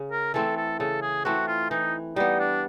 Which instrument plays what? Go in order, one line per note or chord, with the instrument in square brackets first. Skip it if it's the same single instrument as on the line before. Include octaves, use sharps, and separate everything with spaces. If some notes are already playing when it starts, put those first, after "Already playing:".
Already playing: [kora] C#3
[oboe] A#4
[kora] E3 A3 C4 [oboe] A4
[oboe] A4
[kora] C#3 [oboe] A4
[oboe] G#4
[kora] E3 A3 C4 [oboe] F#4
[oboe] F4
[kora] E3 [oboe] D#4
[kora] G3 B3 [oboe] D#4
[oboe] D4